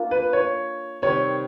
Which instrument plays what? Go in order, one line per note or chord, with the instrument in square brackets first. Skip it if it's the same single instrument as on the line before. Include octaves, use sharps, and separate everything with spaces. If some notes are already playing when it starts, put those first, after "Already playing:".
Already playing: [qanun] A#3 D4 F4 A#4
[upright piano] B4
C#5
[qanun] C3 D#3 G3 [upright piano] C#5